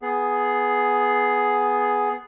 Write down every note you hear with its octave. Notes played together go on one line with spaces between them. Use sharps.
B3 G#4